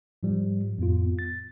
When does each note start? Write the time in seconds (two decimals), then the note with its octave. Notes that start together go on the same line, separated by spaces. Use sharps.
0.23 G#2 F3 G3
0.78 F2 A2 B3 F4
1.19 A6